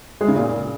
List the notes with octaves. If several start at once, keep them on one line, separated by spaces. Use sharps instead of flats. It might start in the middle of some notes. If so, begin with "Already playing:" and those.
G#3
C#3
A#2